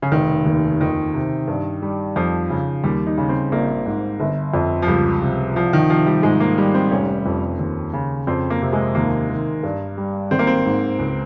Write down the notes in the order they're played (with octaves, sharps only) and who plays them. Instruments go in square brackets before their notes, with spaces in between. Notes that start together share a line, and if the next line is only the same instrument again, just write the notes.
[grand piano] C#3
[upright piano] F1 [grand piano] D#3
[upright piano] D#2
[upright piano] F2 [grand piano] D#3
[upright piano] C3
G2
G3
[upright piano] F2 [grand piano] F3
[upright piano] C#3
[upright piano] D#2 [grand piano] G3
[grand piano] D#4
[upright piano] C#3
[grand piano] C4
[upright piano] A#1 [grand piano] A#3
[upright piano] G#2
G1
F2
[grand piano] F3
[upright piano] C#2 [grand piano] G3
[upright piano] C3
[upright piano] C2 [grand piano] F3
[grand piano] D#3
[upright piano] C3 [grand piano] F3
[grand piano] G3
[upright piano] G#2 [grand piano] G#3
[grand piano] A#3
[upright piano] G3
[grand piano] C4
[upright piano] F1 [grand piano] C#4
[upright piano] F2
D#2
C#3
[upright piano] F2 [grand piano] C4
[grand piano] A#3
[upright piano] C3
[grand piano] G#3
[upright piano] D#2 [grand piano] A#3
[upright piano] D#3
G2
G3
[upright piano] G#1 [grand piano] C4
[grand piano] A#3
C4
[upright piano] G#2
C#2